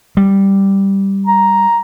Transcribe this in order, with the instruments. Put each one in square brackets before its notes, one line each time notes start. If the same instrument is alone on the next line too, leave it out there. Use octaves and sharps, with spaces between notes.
[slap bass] G3
[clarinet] A#5